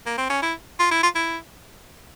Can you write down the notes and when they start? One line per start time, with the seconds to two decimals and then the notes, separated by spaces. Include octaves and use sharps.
0.06 A#3
0.18 C4
0.30 C#4
0.42 E4
0.79 F4
0.91 E4
1.03 F4
1.15 E4